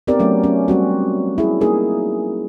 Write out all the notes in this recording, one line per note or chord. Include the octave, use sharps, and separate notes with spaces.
B3 C4 D#4 G4 A#4 D5
F#3 A3 C#4
C#4
G3 C4 F#4
E4 G#4
A#3 D#4 G#4 A#4